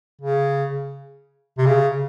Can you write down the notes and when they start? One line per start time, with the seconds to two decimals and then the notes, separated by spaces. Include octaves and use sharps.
0.21 C#3
1.58 C3
1.66 C#3